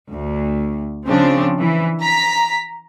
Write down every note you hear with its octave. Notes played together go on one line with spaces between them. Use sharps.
D2
C#3 F3 C4 D4
E3
A#5 B6